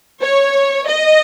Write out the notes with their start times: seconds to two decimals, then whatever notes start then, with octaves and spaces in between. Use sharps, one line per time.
0.21 C#5
0.89 D#5